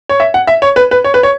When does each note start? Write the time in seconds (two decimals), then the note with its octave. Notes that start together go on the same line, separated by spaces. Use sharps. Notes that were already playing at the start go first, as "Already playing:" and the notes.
0.09 C#5
0.20 E5
0.34 F#5
0.47 E5
0.62 C#5
0.76 B4
0.91 B4
1.04 C#5
1.14 B4
1.23 C#5